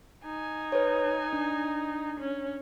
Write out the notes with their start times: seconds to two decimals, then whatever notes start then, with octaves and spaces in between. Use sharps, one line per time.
0.25 D#4 G#5
0.72 B4 C#5
1.33 D4
2.20 C#4